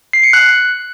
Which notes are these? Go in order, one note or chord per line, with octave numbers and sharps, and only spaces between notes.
C7
C#7
F#6